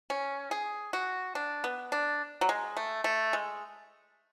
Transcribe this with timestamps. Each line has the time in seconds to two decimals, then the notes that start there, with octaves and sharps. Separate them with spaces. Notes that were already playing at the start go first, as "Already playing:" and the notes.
0.10 C#4
0.51 G#4
0.93 F#4
1.35 D4
1.64 B3
1.92 D4
2.41 F#3
2.49 G#3
2.77 A3
3.04 A3
3.33 G#3